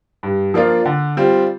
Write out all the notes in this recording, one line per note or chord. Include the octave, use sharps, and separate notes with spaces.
G2
F3 A#3 D4 F4
D3
G3 C4 F4